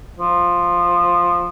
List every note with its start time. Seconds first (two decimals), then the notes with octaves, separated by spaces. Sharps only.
0.19 F3